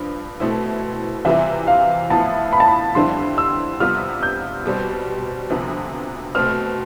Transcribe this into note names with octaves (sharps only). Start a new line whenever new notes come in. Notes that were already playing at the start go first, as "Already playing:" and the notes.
Already playing: G2 F3
B2 A3 C4 E4
C3 E3 G3 C4 F4 E5
F5
A2 F3 B3 E4 A5
B5
A5
B5
F2 D3 G3 C4 E4 C6
E6
C3 G3 B3 F4 F6
G6
B2 G3 C4
D2 C3 F3 B3
B2 A3 C4 F6